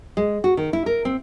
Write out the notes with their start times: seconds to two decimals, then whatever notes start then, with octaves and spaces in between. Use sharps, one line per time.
0.17 G#3
0.44 F#4
0.57 D#3
0.73 E4
0.86 A#4
1.05 C4